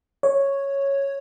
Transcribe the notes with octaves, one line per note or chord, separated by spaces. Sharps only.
C#5